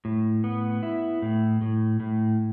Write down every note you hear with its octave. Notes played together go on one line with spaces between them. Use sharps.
A2
B3
E4
A2
A2
A2